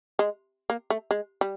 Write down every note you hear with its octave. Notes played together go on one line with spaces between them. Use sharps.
G#3
A#3
A3
G#3
G3